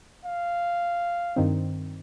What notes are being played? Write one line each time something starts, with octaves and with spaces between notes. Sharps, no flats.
F5
G2 D#3 C4